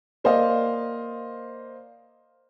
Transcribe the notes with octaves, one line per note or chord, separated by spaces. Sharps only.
A#3 C5 D5 D#5 F5